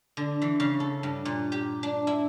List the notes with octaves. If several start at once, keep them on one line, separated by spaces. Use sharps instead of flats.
D3
E3
C#3
A4
G2
A#2
G4
D4
E4